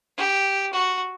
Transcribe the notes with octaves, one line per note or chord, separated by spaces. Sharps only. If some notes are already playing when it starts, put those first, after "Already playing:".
G4
F#4